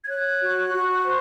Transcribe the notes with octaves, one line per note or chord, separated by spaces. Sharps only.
G#6
C#5 F#6
F#4
F#4
C5